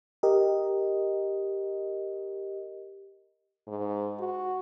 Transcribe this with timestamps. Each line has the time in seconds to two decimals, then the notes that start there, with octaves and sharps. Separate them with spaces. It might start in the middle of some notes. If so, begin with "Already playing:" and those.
0.23 G4 A#4 D#5
3.68 G#2
4.19 F#4